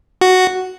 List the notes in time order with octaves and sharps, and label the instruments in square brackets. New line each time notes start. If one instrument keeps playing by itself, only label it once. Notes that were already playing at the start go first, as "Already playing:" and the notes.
[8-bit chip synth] F#4